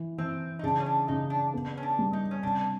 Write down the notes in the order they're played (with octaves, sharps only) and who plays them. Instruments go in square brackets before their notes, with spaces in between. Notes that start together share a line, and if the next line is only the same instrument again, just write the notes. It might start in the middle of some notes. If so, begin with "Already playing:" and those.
Already playing: [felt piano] E3
[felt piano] E3 [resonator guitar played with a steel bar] C4
[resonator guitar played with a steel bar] D#4
[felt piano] C#3 [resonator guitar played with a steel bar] D4
[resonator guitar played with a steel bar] C#4
D4
[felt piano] C#3 [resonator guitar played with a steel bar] D#4
[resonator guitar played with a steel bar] D4
[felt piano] B3
[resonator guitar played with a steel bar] C#4
D4
[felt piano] G3
[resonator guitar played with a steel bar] D#4
C#4
[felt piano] C3 [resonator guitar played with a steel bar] D4